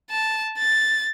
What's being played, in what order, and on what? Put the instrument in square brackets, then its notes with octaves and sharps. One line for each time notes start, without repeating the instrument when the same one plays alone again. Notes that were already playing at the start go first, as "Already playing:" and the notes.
[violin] A5
A6